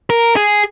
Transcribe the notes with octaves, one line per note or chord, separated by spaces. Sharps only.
A#4
G#4